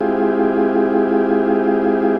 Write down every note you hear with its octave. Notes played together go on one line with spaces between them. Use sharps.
G#3 C4 E4 F4 G4 G#4